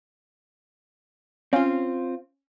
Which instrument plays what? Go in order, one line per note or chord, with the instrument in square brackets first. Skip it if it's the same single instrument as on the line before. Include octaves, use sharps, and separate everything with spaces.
[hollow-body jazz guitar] C4 F4 [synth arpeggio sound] C#4 F5